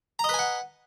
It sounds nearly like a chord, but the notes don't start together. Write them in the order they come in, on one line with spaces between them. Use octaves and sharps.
A#5 D#5 B4 G#5 F#5